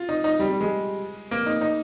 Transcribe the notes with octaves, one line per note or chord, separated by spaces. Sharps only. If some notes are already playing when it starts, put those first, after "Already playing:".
Already playing: F4
D#4
D#4
G3
G3
G#3
A#3
D#4
D#4